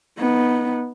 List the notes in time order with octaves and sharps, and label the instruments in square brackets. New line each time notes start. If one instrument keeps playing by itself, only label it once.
[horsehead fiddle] B3 D#4